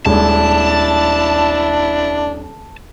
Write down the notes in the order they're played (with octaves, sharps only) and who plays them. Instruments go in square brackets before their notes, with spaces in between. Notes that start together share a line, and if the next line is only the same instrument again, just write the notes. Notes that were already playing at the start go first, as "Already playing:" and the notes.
[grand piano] D#1 G#3 [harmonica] D4 E4 [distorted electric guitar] A5